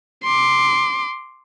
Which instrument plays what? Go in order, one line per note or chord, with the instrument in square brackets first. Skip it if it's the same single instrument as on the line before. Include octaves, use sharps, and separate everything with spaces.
[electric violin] C6 D6